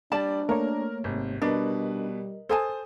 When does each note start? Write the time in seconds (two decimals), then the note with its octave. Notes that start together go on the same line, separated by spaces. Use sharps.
0.12 G3 D4 D5 A5
0.49 A3 A#3 A#4 C#5
1.04 G#1 C3
1.42 B2 G3 D4 A#4 B4 D#5
2.49 A4 C5 G#5 A5 D#6